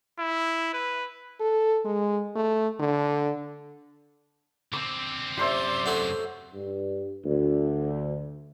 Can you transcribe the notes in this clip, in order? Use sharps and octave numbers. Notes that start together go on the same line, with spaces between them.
E4
B4
A4
G#3
A3
D3
D3 C4 D6
F#2 C3 G4 C5 D5 E5 C6 D6
F#3 A3 F#4
G2
D2